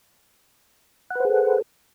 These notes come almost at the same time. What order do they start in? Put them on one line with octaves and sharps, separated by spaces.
F#5 B4 C5 G#4 A4